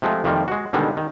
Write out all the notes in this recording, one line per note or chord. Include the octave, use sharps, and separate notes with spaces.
C3 F3 G#3 A3
F2 C3 D#3 F3 G3 A#3
G#3 F#4
B2 D3 D#3 G3 G#3
D#3